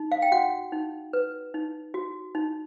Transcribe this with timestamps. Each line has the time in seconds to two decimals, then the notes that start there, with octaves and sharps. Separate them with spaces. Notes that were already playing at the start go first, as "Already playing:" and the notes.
Already playing: D#4
0.12 F5
0.22 G5
0.32 F#4 F#5
0.72 D#4
1.13 B4
1.54 D#4
1.94 F#4
2.35 D#4